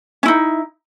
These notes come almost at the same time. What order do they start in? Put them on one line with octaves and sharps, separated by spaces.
C#4 E4 D#4